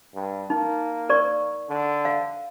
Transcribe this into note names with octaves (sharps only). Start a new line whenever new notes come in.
G2
A#3 D#4
A#4 D5 C#6
D3
F5